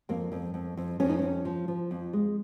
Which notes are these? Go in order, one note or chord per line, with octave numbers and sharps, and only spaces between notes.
F2 A#3
F2
F2
F2
F2 C#4
D#4
F2 C#4
F3
F3
F2
G#3